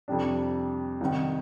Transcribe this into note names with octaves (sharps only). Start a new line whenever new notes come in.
F2 C3 G3 D4
C2 C3 D#3